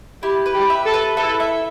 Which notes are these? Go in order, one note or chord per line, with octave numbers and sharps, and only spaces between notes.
E4 G4
B4
G4
E5
A4
B4
E4 A4
E5